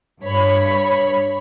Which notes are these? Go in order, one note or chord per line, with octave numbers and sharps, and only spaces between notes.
G2 C#5 B5